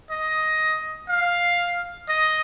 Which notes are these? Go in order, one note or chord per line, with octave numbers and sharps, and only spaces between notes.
D#5
F5
D#5